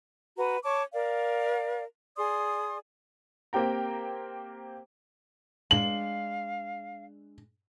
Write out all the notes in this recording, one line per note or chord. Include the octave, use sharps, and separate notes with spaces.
F#4 B4 A#5
C#5 A5 C#6 D6
A#4 D5 F5
G#4 D5 C6 D#6
A#3 C4 G4 G5 A#5
G#3 D4 F5 F#7